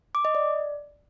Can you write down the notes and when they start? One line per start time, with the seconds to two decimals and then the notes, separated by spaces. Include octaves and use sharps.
0.15 D6
0.25 D#5
0.35 D5